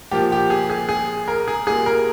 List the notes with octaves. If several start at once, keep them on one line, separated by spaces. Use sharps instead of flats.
A#2 F3 A#3 G4
G4
G#4
G#4
G#4
A#4
G#4
A#2 G3 A#3 G#4
A#4